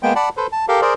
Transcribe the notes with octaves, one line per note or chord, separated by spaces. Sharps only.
G#3 A#3 B3 G5
D5 F#5 A5 B5
A4 B4 C5
A5
G4 A4 A#4 F5
G#4 A#4 C5 D5